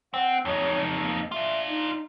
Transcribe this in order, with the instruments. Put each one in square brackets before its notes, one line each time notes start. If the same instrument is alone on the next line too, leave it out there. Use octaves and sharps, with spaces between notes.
[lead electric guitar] C4 [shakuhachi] F#5
[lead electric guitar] F2 D#4 [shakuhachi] C#5
[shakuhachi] A#3
[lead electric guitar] D4 F4 [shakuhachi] E5
[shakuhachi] D#4